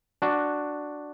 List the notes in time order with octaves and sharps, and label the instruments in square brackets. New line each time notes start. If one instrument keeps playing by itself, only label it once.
[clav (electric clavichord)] D4 F#4